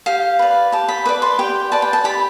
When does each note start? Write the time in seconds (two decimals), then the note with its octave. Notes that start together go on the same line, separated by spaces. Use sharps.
0.06 G4 F5
0.39 B4 D5
0.72 G4 A5
0.88 B5
1.05 B4 D5 D6
1.22 C6
1.39 G4 G5
1.72 B4 D5 A5
1.82 G5
1.93 A5
2.04 G4 B5